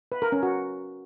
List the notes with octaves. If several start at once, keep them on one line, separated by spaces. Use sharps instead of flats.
B4
A#4
C#4
F#4